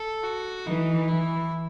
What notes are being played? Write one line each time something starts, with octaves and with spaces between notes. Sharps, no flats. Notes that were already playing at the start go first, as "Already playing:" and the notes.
Already playing: A4
F#4
E3 D#4
E3 E4